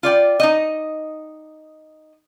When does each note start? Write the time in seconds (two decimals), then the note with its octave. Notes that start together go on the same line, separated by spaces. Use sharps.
0.03 F4 D5 G5
0.40 D#4 D#5